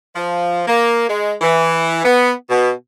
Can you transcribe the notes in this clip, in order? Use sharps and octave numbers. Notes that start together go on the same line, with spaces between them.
F3
A#3
G#3
E3
B3
B2